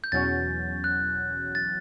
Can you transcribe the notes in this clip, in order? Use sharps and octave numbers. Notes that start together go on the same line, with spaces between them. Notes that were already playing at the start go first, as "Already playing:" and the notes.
G6
E2 B2 F#3 C#4 F#4 A6
F#6
A6